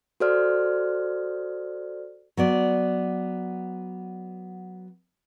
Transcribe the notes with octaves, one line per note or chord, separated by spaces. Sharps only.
F#4 A4 C5 D5 F6
F#3 B3 D5